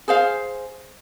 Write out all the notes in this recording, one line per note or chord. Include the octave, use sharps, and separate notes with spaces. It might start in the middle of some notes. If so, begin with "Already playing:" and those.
G#4 C5 F5